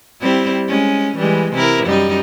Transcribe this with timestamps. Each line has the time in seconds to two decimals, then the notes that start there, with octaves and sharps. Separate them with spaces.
0.21 G3 C4 E4
0.68 G#3 C#4
1.17 E3 G3 G#3
1.53 C3 E4 A#4
1.85 F#2 G3 D#4